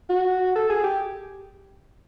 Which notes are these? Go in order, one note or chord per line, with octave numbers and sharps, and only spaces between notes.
F#4
A4
G#4
G4